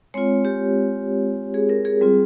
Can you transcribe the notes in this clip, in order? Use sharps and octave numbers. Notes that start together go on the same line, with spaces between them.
G#3 C4 F4 C#5
G4
G#4
A#4
G#4
G3 C4 F4